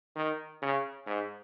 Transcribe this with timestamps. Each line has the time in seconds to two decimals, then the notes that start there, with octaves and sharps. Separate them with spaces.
0.16 D#3
0.62 C#3
1.07 G#2